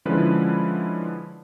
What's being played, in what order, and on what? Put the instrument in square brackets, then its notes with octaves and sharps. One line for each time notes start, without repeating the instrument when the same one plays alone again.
[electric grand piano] D3 F3 G#3 C#4 E4 B4